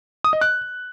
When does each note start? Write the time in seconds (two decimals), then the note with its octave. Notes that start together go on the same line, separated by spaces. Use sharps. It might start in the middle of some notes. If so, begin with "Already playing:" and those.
0.24 D#6
0.33 D#5
0.41 F#6